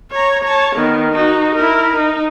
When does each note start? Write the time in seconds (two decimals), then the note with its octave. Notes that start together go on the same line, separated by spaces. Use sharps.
0.11 C#5 A#5
0.44 C#5 A5
0.75 D#3 B3
1.12 D#4 F#4
1.55 E4 A#4
1.96 D#4